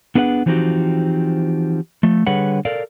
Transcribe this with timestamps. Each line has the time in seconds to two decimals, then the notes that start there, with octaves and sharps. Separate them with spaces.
0.15 B3 D4 G#4 B4 D5 F#5
0.46 E3 F3 C4 D#4 F#4 G4
2.03 F3 A3
2.27 D3 G3 G#4 B4 C#5 F#5
2.65 A4 A#4 D5 F5